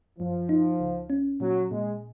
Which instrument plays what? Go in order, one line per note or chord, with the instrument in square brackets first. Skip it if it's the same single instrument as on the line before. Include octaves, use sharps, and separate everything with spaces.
[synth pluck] F#2 [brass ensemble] F3
[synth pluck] D#4
C#2
C#4
[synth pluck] A#2 [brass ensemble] F#3
[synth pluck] A#2 [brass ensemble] G#3